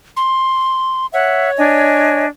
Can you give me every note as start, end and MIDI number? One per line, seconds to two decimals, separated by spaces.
0.17 1.06 84
1.14 2.25 73
1.14 1.50 76
1.14 1.50 78
1.58 2.27 62
1.58 2.27 75
1.58 2.27 80